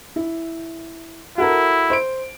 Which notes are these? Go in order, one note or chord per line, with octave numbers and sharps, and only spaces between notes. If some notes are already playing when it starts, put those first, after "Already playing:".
E4
E4 F#4 A4 A#4
C5 D7